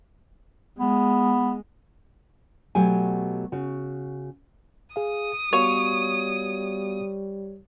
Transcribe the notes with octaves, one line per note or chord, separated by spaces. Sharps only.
G#3 B3
B2 F#3 A3 G4 G#5
C#3 F#4
G#4 F5 D#6
G3 B3 F#4 C#5 F5